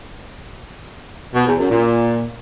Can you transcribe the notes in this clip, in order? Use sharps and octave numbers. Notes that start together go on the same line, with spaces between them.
B2
E2
F#2
A#2